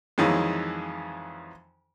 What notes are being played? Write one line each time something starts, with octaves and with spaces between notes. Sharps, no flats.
F2 D#3 E3 F#3 G#3